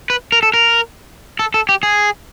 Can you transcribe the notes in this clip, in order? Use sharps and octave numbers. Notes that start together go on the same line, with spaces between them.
B4
A#4
A4
A#4
A4
A4
G4
G#4